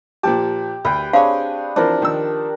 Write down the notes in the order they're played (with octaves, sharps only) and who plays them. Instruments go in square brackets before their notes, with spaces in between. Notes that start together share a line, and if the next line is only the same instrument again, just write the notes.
[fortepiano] A#2 F3 A5 [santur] G4
[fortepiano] D2 [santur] B4 G5
[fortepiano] C4 G#4 C#5 [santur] D4 [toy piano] F5
[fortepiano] E3 F3 C4 [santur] D4 A#4
[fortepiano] D#3 F3 E6